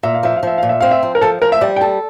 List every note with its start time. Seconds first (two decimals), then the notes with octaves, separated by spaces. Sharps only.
0.03 A#2 E5
0.14 F5
0.23 F3 E5
0.36 F5
0.43 F3 E5
0.58 A#2 F5
0.69 E5
0.81 C4 F5
0.91 E5
1.03 F3
1.15 A#4
1.21 F3 A4
1.42 F3 A#4
1.52 E5
1.61 G3 D5
1.76 G5
1.81 A4 A5